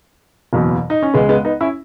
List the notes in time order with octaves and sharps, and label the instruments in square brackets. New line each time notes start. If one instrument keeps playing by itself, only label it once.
[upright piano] F#1 E2 B2 F#3
D#4
C#4
C#2 C#3 G#3 B3
G#3 B3
B3 D#4
C#4 E4